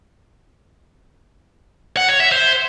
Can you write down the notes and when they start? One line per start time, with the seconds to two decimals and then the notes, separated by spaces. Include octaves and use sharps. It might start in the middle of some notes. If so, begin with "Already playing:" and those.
1.97 F#5
2.09 C#5
2.20 E5
2.32 C5